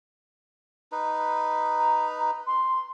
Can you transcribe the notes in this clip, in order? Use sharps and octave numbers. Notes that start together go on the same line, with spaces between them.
D#4 B4
A#5
C6